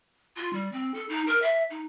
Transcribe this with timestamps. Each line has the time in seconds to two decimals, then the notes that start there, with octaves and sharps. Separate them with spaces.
0.36 F4
0.53 G3
0.72 C4
0.94 A4
1.09 D#4
1.27 A#4
1.42 E5
1.70 D#4